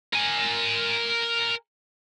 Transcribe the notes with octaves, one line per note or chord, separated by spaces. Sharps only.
A#4 G#5